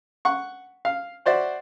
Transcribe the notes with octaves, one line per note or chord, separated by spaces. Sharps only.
F#5 C#6
F5
F#4 C5 D5 E5